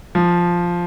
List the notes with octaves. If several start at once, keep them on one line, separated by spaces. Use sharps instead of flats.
F3